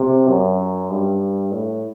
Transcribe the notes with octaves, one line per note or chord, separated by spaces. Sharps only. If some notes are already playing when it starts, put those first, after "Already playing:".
Already playing: C3
F#2
G2
A2